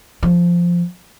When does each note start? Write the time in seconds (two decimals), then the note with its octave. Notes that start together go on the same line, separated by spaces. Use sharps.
0.23 F3